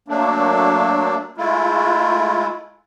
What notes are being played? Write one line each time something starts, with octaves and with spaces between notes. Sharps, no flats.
F#3 A3 A#3 D4
G#3 A3 E4 F4